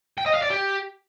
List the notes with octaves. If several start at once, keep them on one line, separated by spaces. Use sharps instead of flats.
G5
D#5
F5
D5
G4